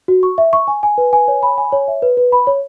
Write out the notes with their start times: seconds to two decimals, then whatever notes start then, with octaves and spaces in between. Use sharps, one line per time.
0.08 F#4
0.23 C#6
0.38 E5
0.53 C#6
0.68 G#5
0.83 G#5
0.98 B4
1.13 G#5
1.28 C#5
1.43 B5
1.58 G#5
1.72 C#5
1.88 E5
2.02 B4
2.17 B4
2.32 B5
2.47 C#5